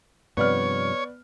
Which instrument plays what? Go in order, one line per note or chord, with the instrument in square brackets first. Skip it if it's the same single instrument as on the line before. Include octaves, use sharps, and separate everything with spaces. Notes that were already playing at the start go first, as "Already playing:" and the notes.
[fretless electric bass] G2 C3 F3 [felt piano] B3 D5 F6 [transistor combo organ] C#5